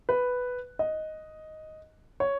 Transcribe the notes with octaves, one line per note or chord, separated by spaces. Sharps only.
B4
D#5
C#5